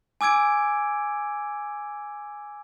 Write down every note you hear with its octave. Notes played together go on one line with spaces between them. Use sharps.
G#5 D6 E6 G#6 D7